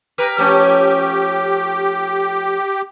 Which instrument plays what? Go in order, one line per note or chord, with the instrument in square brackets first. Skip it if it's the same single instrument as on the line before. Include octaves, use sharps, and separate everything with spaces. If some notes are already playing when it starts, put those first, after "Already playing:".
[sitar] G4 A#4 B4
[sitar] F3 A3 C#4 [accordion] G4